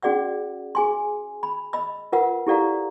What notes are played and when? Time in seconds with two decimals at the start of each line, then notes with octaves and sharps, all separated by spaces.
0.03 C#4 F#4 G#4 D5 F#5 E6
0.75 G#4 G#5 C6
1.43 B5
1.73 D#5 B5 E6
2.12 F4 A#4 B4 F#5 E6
2.47 E4 G4 A4 D5 F5 A#5